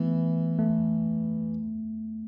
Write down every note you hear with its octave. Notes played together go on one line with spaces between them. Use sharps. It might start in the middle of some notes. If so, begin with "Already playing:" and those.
Already playing: E3 A3 B3
A3